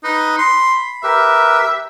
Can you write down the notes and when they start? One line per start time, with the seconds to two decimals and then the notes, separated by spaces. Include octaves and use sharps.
0.04 D#4 B4
0.38 B5 C6
1.03 G4 A#4 B4 E5